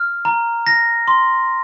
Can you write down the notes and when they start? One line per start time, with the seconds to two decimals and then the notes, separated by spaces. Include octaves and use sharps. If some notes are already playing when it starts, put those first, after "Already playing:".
Already playing: F6
0.25 A#5
0.67 A#6
1.08 C6